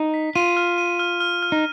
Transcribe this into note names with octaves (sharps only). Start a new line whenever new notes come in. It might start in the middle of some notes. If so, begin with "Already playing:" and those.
Already playing: D#4
B6
F4 D#7
F6
D#7
F6
F6
F6
D#4